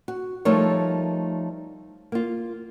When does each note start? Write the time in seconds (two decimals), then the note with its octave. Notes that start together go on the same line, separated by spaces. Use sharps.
0.08 F#4
0.45 F3 G3 A3 D#4 A#4 C#5
2.12 A#3 F4